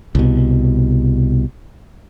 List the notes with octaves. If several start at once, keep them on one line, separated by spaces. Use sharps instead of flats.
C2 B2